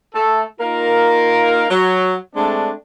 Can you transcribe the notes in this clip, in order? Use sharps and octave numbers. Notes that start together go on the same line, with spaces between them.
A3 A4
A#3 D#4 F4 A#4
F#3
G#3 A3 C4 D4